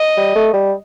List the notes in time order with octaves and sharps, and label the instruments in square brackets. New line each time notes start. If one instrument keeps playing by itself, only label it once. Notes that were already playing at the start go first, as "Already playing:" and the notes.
Already playing: [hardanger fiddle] D#5
[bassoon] G3
A3
G3